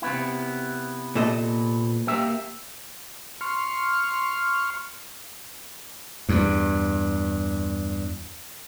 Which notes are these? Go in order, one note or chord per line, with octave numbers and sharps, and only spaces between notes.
C3 B3 E4
A#2 A4 D#5
A#3 G4 E5
C6 C#6 F6
E2 G2